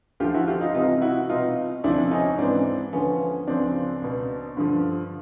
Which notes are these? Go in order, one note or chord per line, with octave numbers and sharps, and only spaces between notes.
D2 D3 F3 F4 G4
E4 F#4
F4 G4
D#4 F4
C2 C3 E3 D#4 F4
E4 F#4
C2 B2 D#4 F4
D2 C3 F3 D4 E4
C#4 D#4
G#2 E3 C4 D4
D2 D3 F3 B3 C#4
C#2 C#3 F3 C4 D4
C#2 B2
G2 D3 F3